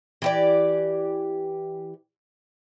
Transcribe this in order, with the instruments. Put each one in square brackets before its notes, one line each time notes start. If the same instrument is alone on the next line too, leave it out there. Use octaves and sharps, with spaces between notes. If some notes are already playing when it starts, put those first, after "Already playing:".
[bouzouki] E3 G4 D5